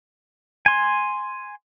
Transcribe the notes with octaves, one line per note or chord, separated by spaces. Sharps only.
G#5 C6